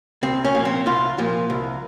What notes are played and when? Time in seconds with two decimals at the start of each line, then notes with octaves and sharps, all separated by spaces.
0.23 C2 C4
0.45 C#4
0.55 A#2 F3
0.65 C4
0.86 C2 F4
1.18 A#2 F3
1.50 C2